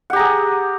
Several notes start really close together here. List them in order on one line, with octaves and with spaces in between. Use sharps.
F#5 G4 A#5 G#4